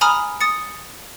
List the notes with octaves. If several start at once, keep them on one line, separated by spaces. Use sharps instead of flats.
G#5 A#5 B5 D#6 F6
D#6 A6 C#7